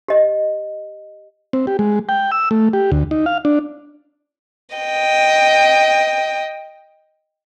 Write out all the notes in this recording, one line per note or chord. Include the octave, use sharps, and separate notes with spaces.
G4 D#5
C4
G4
G#3
G5
E6
A3
G4
D2
D#4
F5
D4
D#5 G5